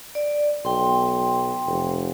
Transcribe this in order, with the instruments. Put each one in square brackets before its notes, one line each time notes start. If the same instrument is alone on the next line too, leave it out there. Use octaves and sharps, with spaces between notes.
[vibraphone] D5
[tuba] B1 [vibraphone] G5 C6
[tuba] F1